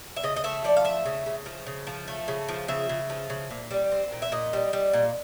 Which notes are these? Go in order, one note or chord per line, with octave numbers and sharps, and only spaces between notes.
E5
C#3 D#5
D#5
A3 E5
F3 D5
F5
A3 E5
C#3
C#3
F3
C#3
F3
A3
C#3
F3
C#3 E5
C#3
F3
C#3
A#2
G3
C4
A#2
E5
A#2 D#5
G3
G3
A#2